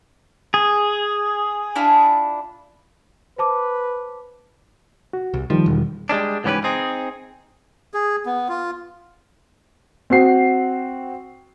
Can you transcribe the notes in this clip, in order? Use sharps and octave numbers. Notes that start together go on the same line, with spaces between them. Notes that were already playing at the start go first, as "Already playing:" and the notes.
G#4
D4 E4 F4
B4 C5 A5 D6
F#4
C2
D#3 F3 G3
E1
G3 G#3 C#4 D4
C#2 G#2 E3 C#4 G4 B4
C4 D#4 G#4
G#4
B3
F4
C4 F#4 C7